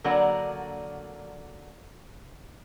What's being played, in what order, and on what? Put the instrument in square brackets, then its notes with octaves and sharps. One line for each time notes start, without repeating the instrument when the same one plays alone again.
[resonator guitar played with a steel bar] D3 F#3 A#3 A#4 D5 F#5